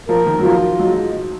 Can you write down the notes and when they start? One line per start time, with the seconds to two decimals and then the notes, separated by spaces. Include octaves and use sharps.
0.09 F3 A#4
0.26 D#3
0.39 F#3
0.43 F3 F4
0.79 F#3 G#3